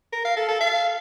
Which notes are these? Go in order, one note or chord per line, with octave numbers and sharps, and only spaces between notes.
A#4
F5
A4
A4
F5